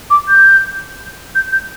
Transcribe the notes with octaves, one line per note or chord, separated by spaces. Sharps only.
D6
G6
G6
G6